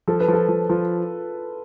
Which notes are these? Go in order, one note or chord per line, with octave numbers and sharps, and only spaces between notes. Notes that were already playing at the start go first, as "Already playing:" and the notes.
F3 A4
B4
F3 A4
F3
F3 F4